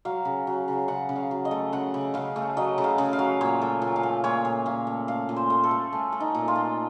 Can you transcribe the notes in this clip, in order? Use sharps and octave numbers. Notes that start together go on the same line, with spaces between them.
F#3 F5
C#3
F#3
C#3
C#3 F#5
C#3
F5
F#3
D#5
A3
C#3 F#5
C#3
C#3 F5
A3
F#3 D#5
C#3
F5
C#3
F5
F#3
A#2 C#5
A3
A#2
F5
A3
A#2 C#5
A#2
A#2 F5
A3
A3 F5
A#2
C5
A3
A4
A3
A3 C#4
A3
D#4
A#2
F4
A3